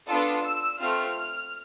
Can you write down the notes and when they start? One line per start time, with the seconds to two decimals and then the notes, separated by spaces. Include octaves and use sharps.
0.08 B3 D4 F4 A4
0.44 E6
0.80 A3 C4 F4 F6